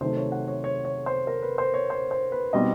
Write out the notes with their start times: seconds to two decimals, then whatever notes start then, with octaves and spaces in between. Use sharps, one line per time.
0.01 C3 D#3 F#3 A3 C5
0.17 C#5
0.32 F#5
0.48 C#5
0.64 C#5
0.85 C#5
1.06 C5
1.27 A#4
1.43 B4
1.58 C5
1.74 C#5
1.90 C5
2.11 C5
2.32 B4
2.53 B2 G3 C4 D#4 D#5